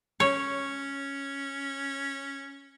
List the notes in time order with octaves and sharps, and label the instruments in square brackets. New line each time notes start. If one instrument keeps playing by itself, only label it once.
[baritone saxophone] C#4 [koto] C#5